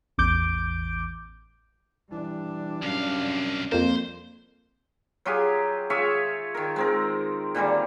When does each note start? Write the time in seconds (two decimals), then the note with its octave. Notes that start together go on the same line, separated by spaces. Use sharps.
0.18 A1 E2 D6 G6 D7
2.12 E3 G3 D4
2.83 C2 F#2 F5
3.72 F2 A#3 C5
5.25 F#3 F4 G4 G#4
5.90 F4 G#4 C#5 E5
6.54 D#3 A#4
6.76 G#3 C4 A#4
7.55 A#2 D3 D#3 G3